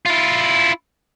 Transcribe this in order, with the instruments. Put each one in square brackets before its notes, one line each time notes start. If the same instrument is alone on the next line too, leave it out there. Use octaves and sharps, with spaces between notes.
[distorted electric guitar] E4 F4